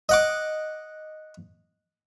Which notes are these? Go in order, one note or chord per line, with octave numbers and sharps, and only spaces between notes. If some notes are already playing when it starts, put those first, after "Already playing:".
D#5 F#5 D6